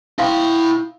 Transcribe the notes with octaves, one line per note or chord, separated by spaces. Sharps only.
E4 E5 F5 G5 C6